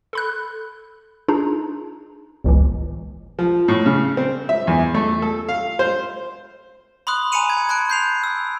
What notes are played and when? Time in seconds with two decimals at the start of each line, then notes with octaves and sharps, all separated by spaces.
0.13 A4 B5 F#6
1.28 D4 D#4 F4 G#4 A#5
2.44 G1 C#2 A2 E3
3.39 F3
3.68 A2
3.86 C#3
4.17 C4
4.49 E5
4.67 E2
4.94 A3
5.22 A4
5.49 F5
5.79 C5
7.07 B5 C6 D#6 F#6
7.32 G#5 A#5 B5 C#7 D#7 F7
7.50 G#6
7.69 A5 C6 F#6 D7
7.90 G6 C7 F7
8.24 E6